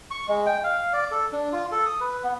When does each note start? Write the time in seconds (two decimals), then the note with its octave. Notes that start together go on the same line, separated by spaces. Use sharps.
0.11 C#6
0.28 G#3
0.46 G5
0.64 F5
0.93 D5
1.11 A4
1.33 D4
1.53 F4
1.72 A4
1.86 D#6
2.00 B4
2.23 B3